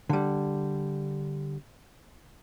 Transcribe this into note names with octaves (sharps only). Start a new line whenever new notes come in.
D3 G3